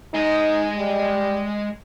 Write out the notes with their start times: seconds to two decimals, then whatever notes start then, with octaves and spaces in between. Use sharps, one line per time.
0.14 G#3 D#4 D#5
0.78 G3